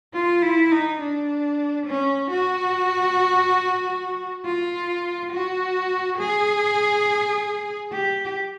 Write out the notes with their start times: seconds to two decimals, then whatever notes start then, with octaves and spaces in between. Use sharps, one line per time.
0.14 F4
0.42 E4
0.71 D#4
1.00 D4
1.86 C#4
2.30 F#4
4.45 F4
5.32 F#4
6.19 G#4
7.92 G4